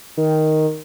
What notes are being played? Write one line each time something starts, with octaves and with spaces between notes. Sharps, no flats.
D#3